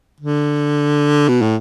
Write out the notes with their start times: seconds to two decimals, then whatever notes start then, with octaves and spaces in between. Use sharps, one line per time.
0.20 D3
1.28 B2
1.42 A2